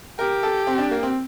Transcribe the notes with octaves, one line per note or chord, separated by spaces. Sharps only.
G4 A#4
A4
C4
D4
A#3
C4